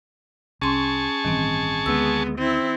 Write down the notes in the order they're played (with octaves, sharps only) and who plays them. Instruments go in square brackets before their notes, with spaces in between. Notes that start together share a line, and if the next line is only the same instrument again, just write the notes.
[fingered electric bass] C2 [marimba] C#4 C6 [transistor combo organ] G#4 A5 C#6
[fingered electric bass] A1 G2 E3 [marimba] D#3 C4
[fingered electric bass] D2 C#4 [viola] G#3 B3 [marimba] E6
[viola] C4 E4